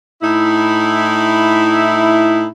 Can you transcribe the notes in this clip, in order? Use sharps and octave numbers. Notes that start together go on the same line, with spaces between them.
A2 D#4 E4